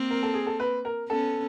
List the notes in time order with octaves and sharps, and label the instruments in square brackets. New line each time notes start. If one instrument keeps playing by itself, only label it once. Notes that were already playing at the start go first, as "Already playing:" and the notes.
Already playing: [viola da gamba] A#3 C4
[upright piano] A#4
A4
G#4
A4
B4
A#4
[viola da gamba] B3 C#4 [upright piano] A4